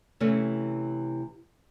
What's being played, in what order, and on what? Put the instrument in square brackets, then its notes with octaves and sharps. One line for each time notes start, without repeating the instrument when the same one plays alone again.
[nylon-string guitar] C3 E3 A3 C#4